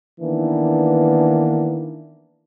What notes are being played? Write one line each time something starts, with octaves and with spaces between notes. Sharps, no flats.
D#3 E3 A#3 B3 D4